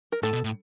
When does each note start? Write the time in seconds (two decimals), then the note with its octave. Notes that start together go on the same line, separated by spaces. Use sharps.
0.12 A#4
0.23 A2 A4
0.33 B2
0.44 A2